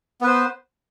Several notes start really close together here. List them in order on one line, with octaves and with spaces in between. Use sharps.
B3 B4 C5